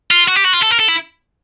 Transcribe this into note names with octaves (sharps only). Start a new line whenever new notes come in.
F4
F#4
G4
F#4
F4
A4
A#4
A4
E4